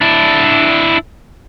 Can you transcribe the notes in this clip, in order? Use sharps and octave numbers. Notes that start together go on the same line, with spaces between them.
D4 E4